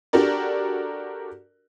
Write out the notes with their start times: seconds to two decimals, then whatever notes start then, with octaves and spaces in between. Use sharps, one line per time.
0.13 D4 F#4 G4 A4 A#4 D5